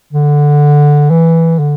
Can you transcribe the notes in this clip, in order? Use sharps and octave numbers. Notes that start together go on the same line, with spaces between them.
D3
E3
D3